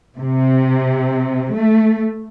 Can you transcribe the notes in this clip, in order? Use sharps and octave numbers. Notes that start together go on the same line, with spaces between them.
C3
A3